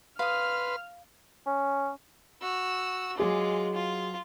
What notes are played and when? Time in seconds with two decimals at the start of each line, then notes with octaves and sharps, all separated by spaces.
0.19 B4 F5 C6 D#6 F6
1.46 C#4
2.41 F#4 E6
3.17 F#3 G#3 F4 G#4 D6
3.73 F4